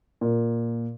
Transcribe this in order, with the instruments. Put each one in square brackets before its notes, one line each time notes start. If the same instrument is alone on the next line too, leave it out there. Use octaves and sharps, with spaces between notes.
[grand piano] A#2